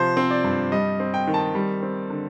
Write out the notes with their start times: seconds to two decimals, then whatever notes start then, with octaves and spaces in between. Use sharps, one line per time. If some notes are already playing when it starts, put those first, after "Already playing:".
Already playing: C3 F3 C5
0.17 C4
0.31 D5
0.44 G2
0.72 G3 D#5
1.00 C4
1.14 G5
1.27 D#3
1.34 A5
1.55 G3
1.82 C4
2.10 D3